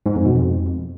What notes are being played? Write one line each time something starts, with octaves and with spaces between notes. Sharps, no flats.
G#2
F2
B2
F2